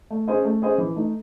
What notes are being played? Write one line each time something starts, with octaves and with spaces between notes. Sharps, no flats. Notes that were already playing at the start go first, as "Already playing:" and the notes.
A3
C#4 G#4 C5 D#5
A3
C#4 G#4 C5 D#5
E3
A3 D#4